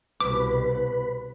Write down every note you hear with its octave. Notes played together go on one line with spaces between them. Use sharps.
C2 B2 B4 D6